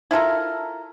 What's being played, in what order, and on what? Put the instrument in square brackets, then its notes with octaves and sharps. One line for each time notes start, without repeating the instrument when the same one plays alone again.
[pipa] E4 F4 A4 A#4